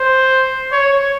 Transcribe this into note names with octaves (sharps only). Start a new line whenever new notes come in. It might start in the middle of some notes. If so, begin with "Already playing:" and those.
Already playing: C5
C#5